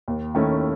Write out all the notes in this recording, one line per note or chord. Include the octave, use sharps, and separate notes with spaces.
D#2
D#3 A3 C#4 E4